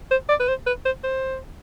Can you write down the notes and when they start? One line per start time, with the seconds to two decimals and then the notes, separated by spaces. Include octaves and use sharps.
0.11 C5
0.29 D5
0.40 B4
0.48 C5
0.67 B4
0.85 C5
1.04 C5